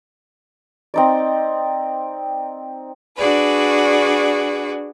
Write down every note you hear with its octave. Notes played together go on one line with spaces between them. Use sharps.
C4 D#4 D5
D4 F#4 G#4 B4 D5